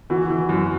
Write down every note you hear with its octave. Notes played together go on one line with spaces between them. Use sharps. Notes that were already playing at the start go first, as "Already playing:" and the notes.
E3 F#4
E3
F#4
F#2